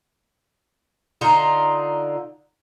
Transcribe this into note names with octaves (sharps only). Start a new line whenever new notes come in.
D3 D#4 F4 A#5